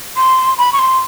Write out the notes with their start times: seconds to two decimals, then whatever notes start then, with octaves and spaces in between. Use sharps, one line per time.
0.16 C6
0.58 B5
0.73 C#6
0.79 C6